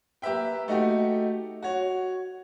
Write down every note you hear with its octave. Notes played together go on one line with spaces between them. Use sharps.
A#3 G4 B4 E5 G5
A3 D#4 F#4 G4
F#4 C#5